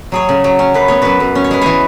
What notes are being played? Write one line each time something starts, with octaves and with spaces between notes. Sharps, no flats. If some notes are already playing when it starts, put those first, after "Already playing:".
F#3 G#4 C#5
C#3
F#3
C#4
F#2 B4
B3 C#5
F#2 F#4 B4
F#2
C#4
C#5
G#3 B4
E3 G#4 C#5